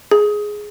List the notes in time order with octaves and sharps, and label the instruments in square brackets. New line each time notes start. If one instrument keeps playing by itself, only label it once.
[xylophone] G#4